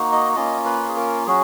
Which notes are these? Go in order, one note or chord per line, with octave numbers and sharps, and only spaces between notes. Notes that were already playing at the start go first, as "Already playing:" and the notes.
Already playing: A#3 D#4 F#4
D#5
A#3 C#4 F4 D#5
B4
G#4
A#4
F#3 C#4 F#4 G#4